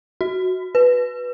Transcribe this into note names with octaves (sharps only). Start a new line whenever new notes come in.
F#4
B4